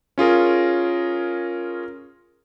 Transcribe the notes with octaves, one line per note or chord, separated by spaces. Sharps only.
C#4 F4 G#4 A#4